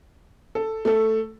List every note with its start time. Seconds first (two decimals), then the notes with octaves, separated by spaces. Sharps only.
0.55 A4
0.85 A3 A4